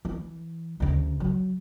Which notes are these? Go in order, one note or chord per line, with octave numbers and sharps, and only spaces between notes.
E3
D2 C#3
F#3